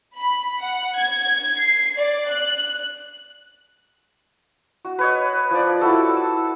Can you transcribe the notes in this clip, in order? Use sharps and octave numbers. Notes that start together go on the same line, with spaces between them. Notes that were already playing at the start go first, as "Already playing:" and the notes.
B5
F#5
G#6
C7
D5
F#6
F#4
B4 C#5 D#5
F3 D5
E4 F#4 A4
E6